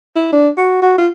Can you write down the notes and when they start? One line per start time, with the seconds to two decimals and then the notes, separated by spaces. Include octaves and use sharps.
0.15 E4
0.33 D4
0.57 F#4
0.82 F#4
0.98 F4